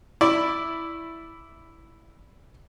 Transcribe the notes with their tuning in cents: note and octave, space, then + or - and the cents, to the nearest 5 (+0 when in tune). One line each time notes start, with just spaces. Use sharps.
E4 +0 D5 +0 C#6 -35